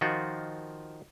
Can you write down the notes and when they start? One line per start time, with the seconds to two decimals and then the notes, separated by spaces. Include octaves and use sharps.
0.01 D#3 F3 F4 F#4